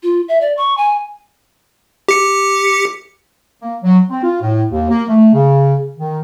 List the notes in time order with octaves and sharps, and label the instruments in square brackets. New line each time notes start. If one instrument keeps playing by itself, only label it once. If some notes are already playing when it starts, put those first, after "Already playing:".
[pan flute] F4
E5
D5
C#6
G#5
[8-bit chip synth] G4 C#7
[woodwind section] A#3
F#3
C4
F4
A2
D#2
A#3
A3
C#3
D#3